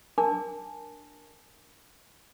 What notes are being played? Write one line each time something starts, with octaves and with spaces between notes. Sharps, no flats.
D4 A#4 G#5 A5 D6